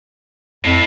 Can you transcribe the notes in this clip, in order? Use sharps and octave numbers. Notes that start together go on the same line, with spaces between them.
F2 A2 E4